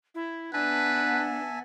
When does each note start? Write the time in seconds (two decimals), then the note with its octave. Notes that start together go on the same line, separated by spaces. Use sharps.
0.15 E4
0.54 B3 D4 B4 E5 F#5 G#5 A5